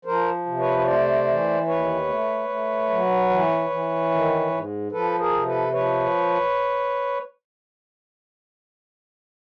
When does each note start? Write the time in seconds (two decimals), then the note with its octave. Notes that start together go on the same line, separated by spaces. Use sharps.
0.05 F3 A#4 C5
0.46 C3
0.59 B4 C#5
0.79 C#5
0.86 A3 C5 D5
1.28 E3
1.67 D#2 B4 C#5
2.08 A3
2.49 A3
2.90 F#3
3.30 E3
3.70 E3
4.10 D#3
4.51 G#2
4.92 F3 A4 B4
5.18 G#4 A#4
5.32 C3
5.46 A4 B4
5.73 F3 B4 C#5